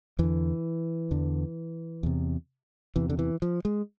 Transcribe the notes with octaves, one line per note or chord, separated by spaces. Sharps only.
E2 D3 E3
E2 D3
E2 C3
E2 C3 E3
D3
E3
F3
G#3